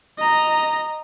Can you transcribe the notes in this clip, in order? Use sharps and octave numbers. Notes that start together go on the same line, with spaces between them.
D#5 A#5